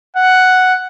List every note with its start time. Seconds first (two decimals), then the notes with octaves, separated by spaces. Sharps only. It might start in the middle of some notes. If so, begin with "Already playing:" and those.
0.16 F#5